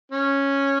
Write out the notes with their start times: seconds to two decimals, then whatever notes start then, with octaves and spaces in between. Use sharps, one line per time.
0.11 C#4